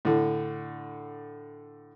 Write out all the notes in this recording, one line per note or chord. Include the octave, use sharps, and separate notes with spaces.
A2 D3